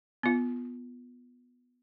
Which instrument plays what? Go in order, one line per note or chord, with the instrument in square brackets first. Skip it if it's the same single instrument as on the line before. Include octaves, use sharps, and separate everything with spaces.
[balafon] B3 F4